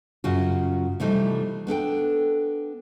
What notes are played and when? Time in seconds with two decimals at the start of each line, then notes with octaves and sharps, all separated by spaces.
0.24 F#2 C#3 F4 F#4
1.00 C3 E3 F3 G3 A3 D#4
1.67 B3 D4 A4 G5